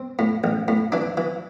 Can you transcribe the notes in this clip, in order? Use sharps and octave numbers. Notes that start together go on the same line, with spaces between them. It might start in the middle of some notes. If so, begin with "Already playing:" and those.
Already playing: C4
A2
A1
A2
E3 D4
E3